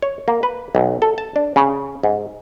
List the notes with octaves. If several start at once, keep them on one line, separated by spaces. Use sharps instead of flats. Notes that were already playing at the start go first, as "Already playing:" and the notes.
C#5
A#3
B4
B1
A4
A5
D4
C#3
G#2